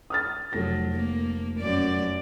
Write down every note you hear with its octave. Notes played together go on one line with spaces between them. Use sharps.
D#6 F6 A6
F1 F#3 A4 A#6
A#3
F#2 D5